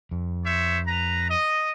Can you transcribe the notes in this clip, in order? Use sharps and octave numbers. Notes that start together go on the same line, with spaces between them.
F2
C5 C#5 E5
B4 A#5
D#5